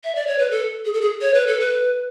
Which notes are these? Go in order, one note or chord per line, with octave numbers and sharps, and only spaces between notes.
E5
D5
C#5
B4
A4
G#4
A4
G#4
C#5
B4
A4
B4